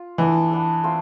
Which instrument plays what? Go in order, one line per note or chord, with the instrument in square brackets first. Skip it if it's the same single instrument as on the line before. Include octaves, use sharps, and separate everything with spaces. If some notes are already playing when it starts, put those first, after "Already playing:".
Already playing: [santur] F4
[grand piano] E3 [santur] B3 D4 A4
[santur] B3 D4 A4
A3 C4 F4 C5